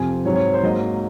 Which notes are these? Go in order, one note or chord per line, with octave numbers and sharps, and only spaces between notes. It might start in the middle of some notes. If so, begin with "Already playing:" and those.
Already playing: F2 C3 F3 C4 G#5
G#2 F#3 C4 C#5
C#5
C5
G#2 F#3 A#3 D#5